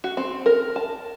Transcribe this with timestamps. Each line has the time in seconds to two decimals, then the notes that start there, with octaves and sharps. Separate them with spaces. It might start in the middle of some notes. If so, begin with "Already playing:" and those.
0.04 F#4
0.17 C4
0.46 A#4
0.76 A5